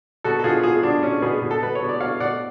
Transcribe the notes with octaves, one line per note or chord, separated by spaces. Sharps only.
B2 F#4 A4
A4
B2 F4 G#4
B2 F4 G#4
B2 D4
B2 C#4
B2 G#4 B4
B2
A4
B2 B4
C#5
B2
D5
B2 C#5 F5
B2 D5 F#5